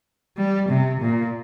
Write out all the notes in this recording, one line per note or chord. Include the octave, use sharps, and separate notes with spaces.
G3
C3
A#2